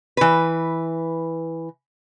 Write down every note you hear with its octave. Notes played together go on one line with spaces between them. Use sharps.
E3 B4